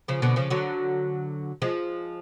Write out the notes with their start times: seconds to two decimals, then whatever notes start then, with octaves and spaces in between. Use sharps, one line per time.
0.08 C#3 F3
0.22 B2 D3
0.36 C#3 F3
0.50 D3 F#3
1.62 F3 G#3